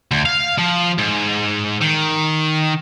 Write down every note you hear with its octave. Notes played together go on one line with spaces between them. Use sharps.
D2
F5
F3
G#2
D#3